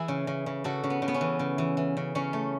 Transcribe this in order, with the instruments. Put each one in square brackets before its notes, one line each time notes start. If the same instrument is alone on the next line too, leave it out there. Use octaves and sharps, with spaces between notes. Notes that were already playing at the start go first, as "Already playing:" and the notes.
Already playing: [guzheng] E3 E4 G#4
C#3
C#3
C#3
C#3 F#4 A4
C#3
B3
C#3
B3
C#4
E3
C#3
E3
E3
C#3
C#3 C#4
A3